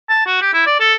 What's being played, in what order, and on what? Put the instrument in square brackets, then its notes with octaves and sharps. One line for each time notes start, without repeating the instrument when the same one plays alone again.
[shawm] A5
F#4
G4
E4
D5
A4